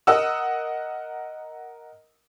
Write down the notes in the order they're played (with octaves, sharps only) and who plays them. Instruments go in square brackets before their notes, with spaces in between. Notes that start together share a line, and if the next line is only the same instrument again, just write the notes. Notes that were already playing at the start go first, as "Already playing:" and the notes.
[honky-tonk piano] A#4 D#5 F#5 D#6 E6